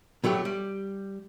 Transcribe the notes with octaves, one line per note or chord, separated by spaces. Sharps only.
B2 F#3 A3 G4
G3